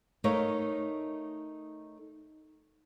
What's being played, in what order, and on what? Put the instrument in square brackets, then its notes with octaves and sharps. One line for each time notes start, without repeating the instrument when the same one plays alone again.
[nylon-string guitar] A3 D#4 A#4 C#5 D#5 F5